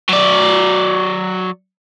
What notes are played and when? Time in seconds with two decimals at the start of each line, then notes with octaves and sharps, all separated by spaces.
0.09 F#3 D5